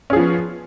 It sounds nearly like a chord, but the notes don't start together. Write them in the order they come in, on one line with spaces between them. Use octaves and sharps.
C#4 G#4 F3 B3